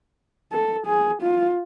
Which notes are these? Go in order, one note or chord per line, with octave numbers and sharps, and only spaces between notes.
A4
G#4
F4